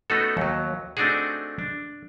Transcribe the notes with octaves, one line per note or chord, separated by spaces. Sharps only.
A3 B3 C#4 D#4 F#4 A4
D#2 F#3
A3 C4 D4 D#4 F#4 G#4
D4